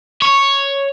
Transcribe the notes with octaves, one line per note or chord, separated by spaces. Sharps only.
C#5